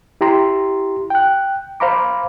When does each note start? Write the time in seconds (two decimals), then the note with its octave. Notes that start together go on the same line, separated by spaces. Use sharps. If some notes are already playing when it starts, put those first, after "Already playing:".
0.21 E4 G4 A#5 C6
1.10 G5 F#6
1.80 C5 F5 A#5 B5 D6